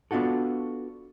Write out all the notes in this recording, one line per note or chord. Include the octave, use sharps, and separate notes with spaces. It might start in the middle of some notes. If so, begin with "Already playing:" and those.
B3 D4 F4 F#4 A4